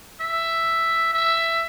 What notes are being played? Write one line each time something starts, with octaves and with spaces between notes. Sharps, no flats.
E5
E5